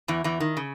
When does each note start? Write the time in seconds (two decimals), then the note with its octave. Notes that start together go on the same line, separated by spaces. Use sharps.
0.08 E2 E3
0.24 E2 E3
0.40 D#3
0.57 C#3